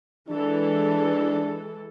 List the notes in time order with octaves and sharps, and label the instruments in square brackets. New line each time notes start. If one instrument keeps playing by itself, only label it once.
[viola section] E3 G#3 A4 [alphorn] D4